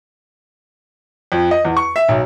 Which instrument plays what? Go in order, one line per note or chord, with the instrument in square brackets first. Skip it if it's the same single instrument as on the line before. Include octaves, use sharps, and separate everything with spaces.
[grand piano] F2
D#5
E2
C#6
E5
B1